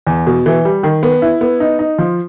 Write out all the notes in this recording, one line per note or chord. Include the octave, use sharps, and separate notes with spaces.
E2
B2
E3
G3
D#3
B3
E4
B3
D#4
D#4
F3